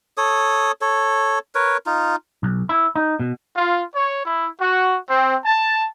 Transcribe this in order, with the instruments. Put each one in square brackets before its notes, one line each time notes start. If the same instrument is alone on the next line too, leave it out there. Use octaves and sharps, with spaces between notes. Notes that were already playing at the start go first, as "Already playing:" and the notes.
[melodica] A4 C#5 D#6
A4 C#5
A#4 B4 C#5
D#4 F4
[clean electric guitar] B1
E4
D#4
B2
[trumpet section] F4
C#5
E4
F#4
C4
A5